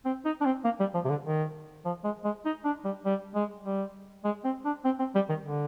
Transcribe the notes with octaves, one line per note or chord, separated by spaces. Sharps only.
C4
D#4
D4
C4
A#3
G3
F3
C3
D3
D#3
F3
G#3
G#3
D#4
D4
G3
G3
G#3
G3
G#3
C4
D4
C4
C4
G3
D#3
D3